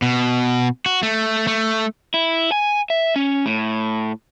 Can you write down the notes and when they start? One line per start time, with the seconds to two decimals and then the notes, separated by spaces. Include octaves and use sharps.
0.02 B2
0.86 F#4
1.03 A3
1.47 A3
2.14 E4
2.52 G#5
2.90 E5
3.16 C#4
3.46 A2